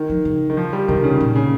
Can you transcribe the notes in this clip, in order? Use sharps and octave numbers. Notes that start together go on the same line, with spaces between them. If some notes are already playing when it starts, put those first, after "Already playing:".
Already playing: D#3
F3
C#3
D#3
F3
G3
C3 D#3
C#3
A#2
C#3